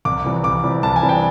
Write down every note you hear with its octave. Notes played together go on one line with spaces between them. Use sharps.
C2 D6
C3 E3 G3
C2 D6
C3 E3 G3
C2 A5
G#5
C3 E3 G3
G5